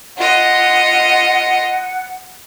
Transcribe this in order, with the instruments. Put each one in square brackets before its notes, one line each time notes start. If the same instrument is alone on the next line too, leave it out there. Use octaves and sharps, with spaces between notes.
[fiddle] F4 D#5 [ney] F#5